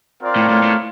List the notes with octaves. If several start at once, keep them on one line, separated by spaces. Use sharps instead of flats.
C4 F4 A#4 D5
A2
A2
A2